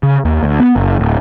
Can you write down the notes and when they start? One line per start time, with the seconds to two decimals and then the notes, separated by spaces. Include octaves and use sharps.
0.03 C#3
0.25 D#2
0.43 D2
0.60 B3
0.76 F#1
0.99 D1